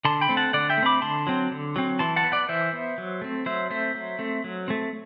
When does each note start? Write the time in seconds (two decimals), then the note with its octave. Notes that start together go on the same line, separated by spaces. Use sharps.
0.05 D3 A5 C6
0.21 G5 B5
0.29 A3 C4
0.37 F#5 A5
0.53 D3 D5 F#5
0.70 E5 G5
0.77 A3
0.83 C4 B5 D6
1.02 D3 A5 C6
1.27 F#3 C4
1.51 D3
1.76 F#3 C4
1.99 E3 A5 C6
2.16 F#5 A5
2.24 B3
2.32 D5 F#5
2.49 E3 C5 E5
2.73 B3
2.98 F#3
3.22 A3 C4
3.46 F#3 C5 E5
3.70 A3 C4 C5 E5
3.94 F#3
4.19 A3 C4
4.44 F#3
4.68 A3 C4